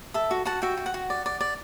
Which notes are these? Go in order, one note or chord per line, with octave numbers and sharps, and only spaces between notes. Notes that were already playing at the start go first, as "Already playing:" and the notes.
A4 E5
F#4
F#4 F#5 A5
F#4 E5 G5
F#4
F#5
F#4
D5
D5
D5